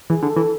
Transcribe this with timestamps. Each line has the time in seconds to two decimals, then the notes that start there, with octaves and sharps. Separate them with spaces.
0.10 E3 G#4
0.22 D3
0.29 A4
0.36 E3